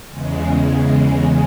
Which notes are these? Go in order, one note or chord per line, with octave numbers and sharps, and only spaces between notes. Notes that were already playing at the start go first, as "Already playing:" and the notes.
E2 C#3 G#3